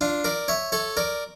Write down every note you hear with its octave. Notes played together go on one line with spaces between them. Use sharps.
D4 F4
A#4 D5
C#5 E5
A4 C#5
A#4 D5